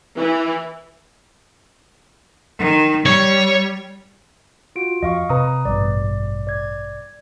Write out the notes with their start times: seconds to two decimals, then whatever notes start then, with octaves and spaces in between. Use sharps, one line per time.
0.18 E3
2.59 D#3
3.06 G3 C#5
4.76 F4 F#4 D7
5.03 F2 D#5 F5 C#6
5.29 C3 B4 A#5 D#6
5.65 A1 G2 B2 D5
6.47 D5 G#6